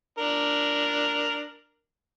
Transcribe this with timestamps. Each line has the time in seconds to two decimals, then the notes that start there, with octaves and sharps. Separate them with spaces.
0.18 D4 A#4